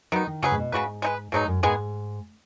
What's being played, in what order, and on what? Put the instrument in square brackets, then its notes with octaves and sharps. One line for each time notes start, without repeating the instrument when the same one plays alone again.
[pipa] D#3 B3 D#4 [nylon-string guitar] F#3
[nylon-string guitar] D#3
[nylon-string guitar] C#3 [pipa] F#3 C#4 G#4 B4
[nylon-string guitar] G#2
B2
[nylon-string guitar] G#2 [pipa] C#3 B3 F#4 B4
[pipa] G#3 D#4 B4
[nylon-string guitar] G#2 [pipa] B2 F#3 B3 D#4
[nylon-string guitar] F#2
[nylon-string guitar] G#2 [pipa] D#3 G#3 B3 G#4